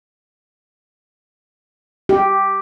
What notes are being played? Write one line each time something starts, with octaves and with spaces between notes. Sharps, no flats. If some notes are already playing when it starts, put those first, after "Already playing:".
G4